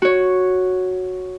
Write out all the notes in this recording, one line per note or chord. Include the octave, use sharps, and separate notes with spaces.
F#4 C#5